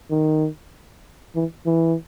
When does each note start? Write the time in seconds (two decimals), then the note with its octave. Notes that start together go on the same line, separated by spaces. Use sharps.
0.10 D#3
1.35 E3
1.66 E3